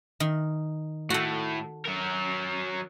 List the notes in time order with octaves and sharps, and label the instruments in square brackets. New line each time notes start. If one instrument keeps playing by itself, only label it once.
[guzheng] D#3
[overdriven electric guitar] A2 [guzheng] F#4 A4
[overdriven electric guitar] F#3 A#4